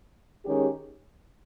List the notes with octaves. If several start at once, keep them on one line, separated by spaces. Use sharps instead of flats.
D#3 G#3 C#4 G4